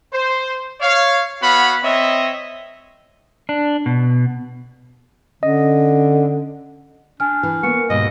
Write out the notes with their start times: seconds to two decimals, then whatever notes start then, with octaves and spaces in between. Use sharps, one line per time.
0.13 C5
0.81 C#5 F5
1.42 B3 F#4 C#5 F5 F#5 B5
1.83 C4 C#5 D#5 E5
3.49 D4
3.86 B2
5.43 D3 C#4 D#5
7.20 D4 G#5 F6
7.43 E3
7.63 A#3 B3 C#6
7.90 D#2 G#2 B2 D#5